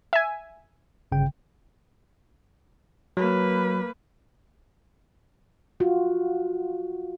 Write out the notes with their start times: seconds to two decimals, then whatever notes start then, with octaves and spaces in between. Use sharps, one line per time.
0.13 E5 G#5
1.12 G1 C#3 G5
3.17 F#3 A#3 B4
5.80 F4 F#4